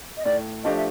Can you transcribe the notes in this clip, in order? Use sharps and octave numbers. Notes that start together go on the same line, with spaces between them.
D#5
A2 D5
F3 A3 D4 G4 D#5
E5